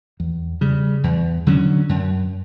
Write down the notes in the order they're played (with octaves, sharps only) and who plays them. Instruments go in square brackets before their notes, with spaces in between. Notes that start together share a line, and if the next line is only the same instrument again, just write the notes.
[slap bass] E2
C#3 G3
E2
D3 F#3 C#4
F#2